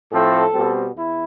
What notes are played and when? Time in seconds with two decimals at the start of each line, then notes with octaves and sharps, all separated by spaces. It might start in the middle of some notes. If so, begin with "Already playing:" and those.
0.11 A2 F3 A3 C4 A4
0.53 B2 G3 C4
0.96 E2 E4